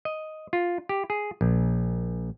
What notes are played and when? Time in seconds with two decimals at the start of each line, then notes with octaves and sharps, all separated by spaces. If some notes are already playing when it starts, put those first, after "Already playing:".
0.05 D#5
0.53 F4
0.89 G4
1.10 G#4
1.41 A#1